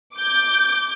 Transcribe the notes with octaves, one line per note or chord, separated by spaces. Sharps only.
D6 G6